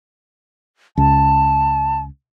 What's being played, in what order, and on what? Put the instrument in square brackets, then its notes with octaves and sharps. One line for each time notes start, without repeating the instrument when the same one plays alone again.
[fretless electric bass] C#2 [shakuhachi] A5